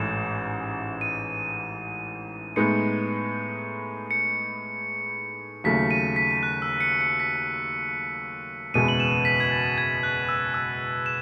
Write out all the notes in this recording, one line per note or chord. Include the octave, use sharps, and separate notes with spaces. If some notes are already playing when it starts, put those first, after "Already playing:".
Already playing: A1 G#2 E3 A3 D#4 E7
D#7
A2 G#3 B3 D#4 C#7
C#7
D#2 C#3 F#3 A3 B6
D#7
B6
F#6
E6
C#7
C#7
B6
F#1 E2 B2 G#3 B3 D#7
F#7
E7
B6
G#6
A6
G#6
F#6
E6
E6
E7